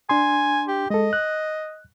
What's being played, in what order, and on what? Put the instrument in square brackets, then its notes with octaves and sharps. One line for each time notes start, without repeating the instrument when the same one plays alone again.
[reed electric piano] D4 C6 [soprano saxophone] G#5
[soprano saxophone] G4
[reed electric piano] G#3 A4 [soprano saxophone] D#5
[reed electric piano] F#6